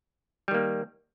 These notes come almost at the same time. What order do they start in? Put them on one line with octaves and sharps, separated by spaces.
G3 D#3 A#3